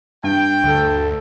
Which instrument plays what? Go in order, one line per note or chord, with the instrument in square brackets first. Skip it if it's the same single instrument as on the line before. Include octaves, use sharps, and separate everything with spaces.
[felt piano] G2 [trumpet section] G5
[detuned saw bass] D2 [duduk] A4